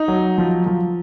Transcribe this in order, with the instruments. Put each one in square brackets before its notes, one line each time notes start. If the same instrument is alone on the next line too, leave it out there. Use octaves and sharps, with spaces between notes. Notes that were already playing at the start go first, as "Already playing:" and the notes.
Already playing: [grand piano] D#4
F#3
F3
F3